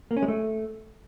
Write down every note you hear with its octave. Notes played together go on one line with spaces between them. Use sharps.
A#3
C#4
G#3
A3